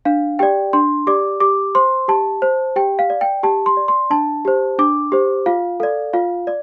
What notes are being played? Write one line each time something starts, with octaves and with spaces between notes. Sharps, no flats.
D4 F5
G4 D5 G5
D4 C6
G4 D5 D6
G4 D6
C5 C6
G4 A5
C5
G4 G5
F5
D5
G5
G4 A5
C6
D5
C6
D4 A5
G4 C5
D4 D6
G4 C5
F4 F5
A4 D5 F5
F4 F5
D5